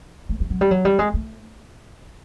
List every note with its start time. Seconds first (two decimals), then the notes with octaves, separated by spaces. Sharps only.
0.29 A3
0.40 G3
0.50 F#3
0.61 G3
0.71 F#3
0.85 G3
0.99 G#3
1.14 A3